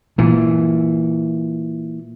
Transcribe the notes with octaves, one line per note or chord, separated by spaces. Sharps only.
A#2 E3